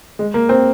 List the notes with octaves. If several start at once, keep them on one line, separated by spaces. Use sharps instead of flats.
G#3
A#3
C4